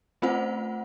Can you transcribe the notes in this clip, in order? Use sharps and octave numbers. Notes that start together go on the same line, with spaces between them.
A3 C4 C#4 F4 C5 F#5